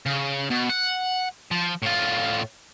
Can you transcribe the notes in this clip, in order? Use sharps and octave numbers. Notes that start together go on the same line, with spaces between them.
C#3
B2
F#5
F3
A2 F4